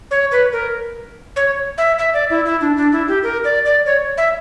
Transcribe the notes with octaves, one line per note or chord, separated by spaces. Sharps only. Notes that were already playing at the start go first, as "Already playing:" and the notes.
C#5
B4
A#4
C#5
E5
E5
D5
E4
E4
D4
D4
E4
G4
A#4
D5
D5
C#5
E5